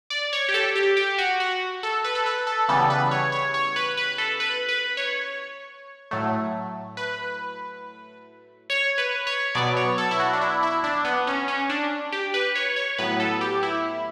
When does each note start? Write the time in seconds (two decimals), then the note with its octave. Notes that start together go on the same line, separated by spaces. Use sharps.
0.10 D5
0.33 C#5
0.49 G4
0.54 A4
0.75 G4
0.97 G4
1.18 F#4
1.40 F#4
1.83 A4
2.04 B4
2.15 A4
2.26 B4
2.47 A4
2.68 C#3 E3 G3 B3 A4
2.90 B4
3.11 C#5
3.32 C#5
3.54 C#5
3.76 B4
3.97 B4
4.18 A4
4.40 B4
4.69 B4
4.97 C#5
6.11 A2 F#3 A3
6.97 B4
8.70 C#5
8.98 B4
9.27 C#5
9.55 B2 F#3 B3 D5
9.77 C#5
9.98 A4
10.11 E4
10.20 F#4
10.33 D4
10.41 E4
10.63 E4
10.84 D4
11.05 B3
11.27 C#4
11.48 C#4
11.70 D4
12.12 G4
12.34 B4
12.55 C#5
12.76 C#5
12.98 A2 F#3 B3 B4
13.20 A4
13.41 G4
13.63 E4